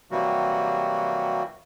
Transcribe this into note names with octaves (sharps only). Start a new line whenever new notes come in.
C3 E3 F#3 G3 A#3 F#4